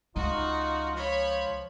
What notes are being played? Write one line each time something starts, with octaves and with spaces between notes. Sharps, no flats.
C#2 D#4 F4 F#4
F3 C#5 B5